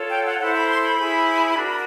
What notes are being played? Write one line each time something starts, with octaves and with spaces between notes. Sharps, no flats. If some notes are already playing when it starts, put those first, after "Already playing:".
Already playing: F4 A4 C#5
G5
F#5
E4 A4 C5 F#5
B5
C6
B5
E4 G#4 C5
D4 F#4 A#4